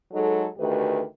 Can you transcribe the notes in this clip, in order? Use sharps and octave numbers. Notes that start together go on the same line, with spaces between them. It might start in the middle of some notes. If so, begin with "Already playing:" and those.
F#3 G#3 D#4 A4
D2 D#3 A3 G4 B4